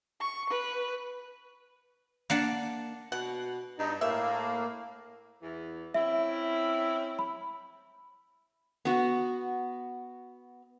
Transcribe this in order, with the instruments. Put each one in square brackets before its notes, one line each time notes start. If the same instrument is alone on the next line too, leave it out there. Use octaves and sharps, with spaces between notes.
[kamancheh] C#6
B4
[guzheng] A#3 D4 F#5 A5
[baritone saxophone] B2 [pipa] F#5
[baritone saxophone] G2 [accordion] D#4
[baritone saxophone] A2 [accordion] A#3 [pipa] E5
[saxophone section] E2 E3
[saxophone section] C4 C#4 E4 [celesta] E5
[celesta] B5
[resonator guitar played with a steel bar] B3 F#4